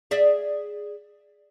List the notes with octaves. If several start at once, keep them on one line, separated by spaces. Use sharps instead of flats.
G#4 D5 E5